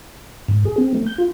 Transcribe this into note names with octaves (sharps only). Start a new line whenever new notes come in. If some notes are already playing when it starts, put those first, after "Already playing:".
G#2
G#4
C4
A3
G6
F4